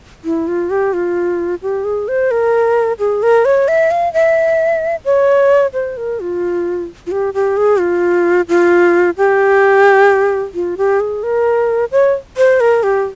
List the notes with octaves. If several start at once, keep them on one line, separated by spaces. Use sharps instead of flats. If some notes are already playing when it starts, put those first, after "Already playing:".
E4
F4
G4
F4
G4
G#4
C5
A#4
G#4
A#4
C#5
E5
F5
E5
C#5
C5
A#4
F4
F4
G4
G4
G#4
F4
F4
G4
F4
G4
G#4
A#4
C#5
C5
A#4
G4